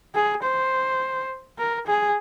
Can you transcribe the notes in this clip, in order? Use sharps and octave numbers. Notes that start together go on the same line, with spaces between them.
G#4
C5
A#4
G#4